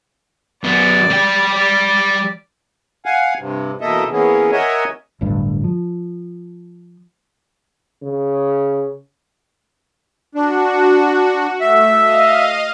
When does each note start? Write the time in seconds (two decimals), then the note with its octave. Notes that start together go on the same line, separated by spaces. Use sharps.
0.64 F#2 B3 D5
1.10 G3 G5
1.54 D5
3.06 F5 F#5 G#5
3.39 G2 C3
3.81 E2 B2 A#3 A4 D#5 E5
4.12 E3 A#3 B3 C#4 G#4
4.52 A#4 C#5 D#5 E5 F#5 G#5
5.21 D1 G1 D2 G2
5.64 F3
8.03 C#3
10.35 D4 F#4
11.61 A3 E5
11.99 D#5 F5